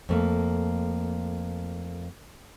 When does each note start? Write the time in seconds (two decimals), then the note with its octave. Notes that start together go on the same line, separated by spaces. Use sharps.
0.09 F2 A3 A#3